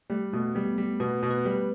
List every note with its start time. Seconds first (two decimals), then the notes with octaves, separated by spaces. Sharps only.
0.10 G3 A3
0.33 B2 A3
0.55 G3 B3
0.78 G3
1.00 B2 B4
1.23 B2
1.30 B4
1.45 G3